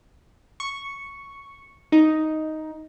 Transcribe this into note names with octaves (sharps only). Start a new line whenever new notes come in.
C#6
D#4